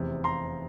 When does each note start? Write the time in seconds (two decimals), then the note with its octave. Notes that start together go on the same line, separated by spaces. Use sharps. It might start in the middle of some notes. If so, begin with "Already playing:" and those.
Already playing: F1 E2 C3
0.24 A#5 C6